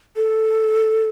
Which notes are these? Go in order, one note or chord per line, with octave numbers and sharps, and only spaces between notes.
A4